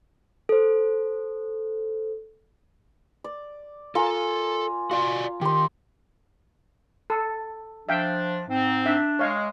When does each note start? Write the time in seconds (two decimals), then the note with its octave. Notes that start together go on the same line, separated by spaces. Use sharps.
0.49 A4 C5
3.24 D5
3.95 F4 A4 A#4 G#5
4.91 F4 F#4 D5 G#5
5.41 D#3 G4 C6
7.10 A4
7.89 F3 D4 E5 F5 G5
8.48 G#2 C4
8.86 D4 E5
9.19 G#3 C#5 F5